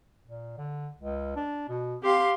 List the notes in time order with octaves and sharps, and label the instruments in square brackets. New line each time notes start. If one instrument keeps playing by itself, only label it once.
[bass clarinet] A#2
D3
C#2
D4
B2
[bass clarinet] C4 [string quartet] G4 F5 C6